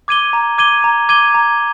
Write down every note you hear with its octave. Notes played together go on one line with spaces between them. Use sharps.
D6 G#6 D#7 G7
A#5
D6 G#6 D#7 G7
A#5
D6 G#6 D#7 G7
A#5